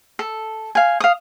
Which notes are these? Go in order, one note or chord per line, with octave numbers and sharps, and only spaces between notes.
A4
F5 G#5
F5 D#6